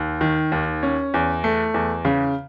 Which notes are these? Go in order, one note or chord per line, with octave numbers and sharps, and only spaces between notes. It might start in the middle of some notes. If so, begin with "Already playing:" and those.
Already playing: D#2
D#3
D#2
C#4
E2
A3
E2
C#3